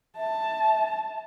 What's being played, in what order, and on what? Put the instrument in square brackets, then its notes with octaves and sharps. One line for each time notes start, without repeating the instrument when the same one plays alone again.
[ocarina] E5 [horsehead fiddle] A5